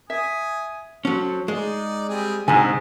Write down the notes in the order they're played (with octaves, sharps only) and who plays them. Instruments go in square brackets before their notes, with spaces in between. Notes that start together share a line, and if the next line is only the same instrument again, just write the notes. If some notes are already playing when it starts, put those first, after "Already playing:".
[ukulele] E5 [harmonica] G#5 D#6
[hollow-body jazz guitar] F#3 C#4 [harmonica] A4 C5
[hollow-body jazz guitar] G#3 [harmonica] D#4 D5
[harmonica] G3 C4 G#4
[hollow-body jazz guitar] C2 D3 [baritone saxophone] G#2 [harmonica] C4 [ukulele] G#5